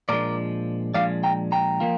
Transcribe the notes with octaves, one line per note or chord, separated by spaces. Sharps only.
A#2 F3 G#3 D4 A#4 D5
A#2 F3 G#3 D4 D5 F5
G5 A#5
G5 A#5
F3 A#3 F4